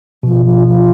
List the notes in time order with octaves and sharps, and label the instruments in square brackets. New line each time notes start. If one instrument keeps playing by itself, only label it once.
[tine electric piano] B2 [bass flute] F3
[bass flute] F3
F3